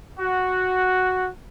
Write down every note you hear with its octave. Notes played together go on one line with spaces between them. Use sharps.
F#4